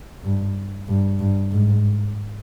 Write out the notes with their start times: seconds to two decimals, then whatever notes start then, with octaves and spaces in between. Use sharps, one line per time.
0.24 G2
0.88 G2
1.19 G2
1.52 G#2